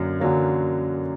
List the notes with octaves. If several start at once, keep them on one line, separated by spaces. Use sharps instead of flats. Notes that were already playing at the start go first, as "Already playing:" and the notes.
Already playing: F#2 D3 F#3 A#3
F#2 D3 F#3 A#3